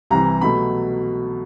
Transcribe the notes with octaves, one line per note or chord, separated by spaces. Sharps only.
C2 C3 E3 A#5
B2 F#3 A3 B5